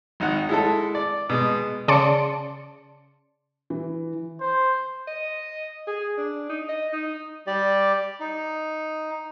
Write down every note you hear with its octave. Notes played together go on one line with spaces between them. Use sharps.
G#1 D#4 F#5
G#3 E4 A4
D5
B2 G#3
C#3 D5 A5 C6 C#7 D7
E3
C5
D#5
G#4
D4
D#4
D#5
D#4
G3 G4 D5
D#4